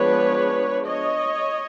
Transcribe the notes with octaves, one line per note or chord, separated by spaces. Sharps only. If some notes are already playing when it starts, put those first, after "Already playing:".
Already playing: F3 G#3 B3 D4 B4 C#5
C#5 D#5